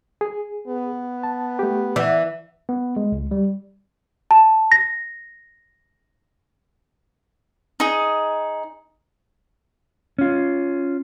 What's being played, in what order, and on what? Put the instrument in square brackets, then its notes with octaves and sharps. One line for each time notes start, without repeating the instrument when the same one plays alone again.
[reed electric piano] G#4
[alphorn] B3
[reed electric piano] A5
A3 G4
[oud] E3 [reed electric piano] D5 F#5
[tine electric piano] B3
G#3
C#2
G3
[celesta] A5
A#6
[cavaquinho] D#4 G#4
[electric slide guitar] C#4 F4